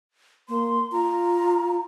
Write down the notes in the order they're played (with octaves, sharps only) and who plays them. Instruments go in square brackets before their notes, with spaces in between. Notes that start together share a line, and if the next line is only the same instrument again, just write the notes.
[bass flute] A#3 [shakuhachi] C6
[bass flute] F4 [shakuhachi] A#5